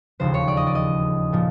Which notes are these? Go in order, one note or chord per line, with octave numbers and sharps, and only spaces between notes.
E1 D#2 C#3 F3 C5
C#5
D5
D#5
D5
D#5
A#2 F3